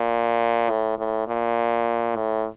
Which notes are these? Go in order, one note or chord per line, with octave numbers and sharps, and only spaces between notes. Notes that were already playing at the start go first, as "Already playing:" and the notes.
Already playing: A#2
A2
A2
A#2
A2